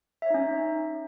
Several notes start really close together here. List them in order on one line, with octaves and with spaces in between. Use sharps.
E5 C#5 D#4 C#4